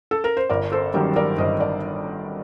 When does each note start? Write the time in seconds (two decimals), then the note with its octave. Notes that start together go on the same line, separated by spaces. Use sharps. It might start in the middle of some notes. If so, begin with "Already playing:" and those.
0.11 A4
0.24 A#4
0.37 C5
0.50 G1 A#4 D5
0.72 A4 C5
0.94 G2 D#3 F#3 G4 A#4
1.16 A#4 D5
1.38 G1 C5 D#5
1.60 A#4 D5